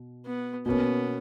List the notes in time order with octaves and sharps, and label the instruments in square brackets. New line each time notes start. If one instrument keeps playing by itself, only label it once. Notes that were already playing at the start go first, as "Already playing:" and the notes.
Already playing: [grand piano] B2
[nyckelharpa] B3
[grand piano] B2 A#3 C#4 [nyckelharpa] B3